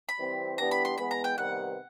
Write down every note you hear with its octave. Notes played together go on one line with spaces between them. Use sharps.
B5
E3 G3 C4
E3 G3 B3 D4 G4 A#5
B5
C6
E3 G#3 B3 B5
A#5
G5
C3 D#3 G3 B3 F#5